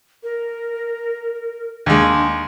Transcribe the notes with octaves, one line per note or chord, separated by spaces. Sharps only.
A#4
D#2 G#3 D4